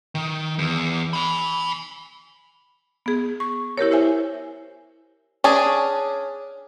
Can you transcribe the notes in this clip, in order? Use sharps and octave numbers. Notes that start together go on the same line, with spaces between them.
D#3
E2
G#5 B5
B3 G#4
C#6
E4 G4 A#4 C#5
E4 C5 E5 G#5
C#4 D4 G#4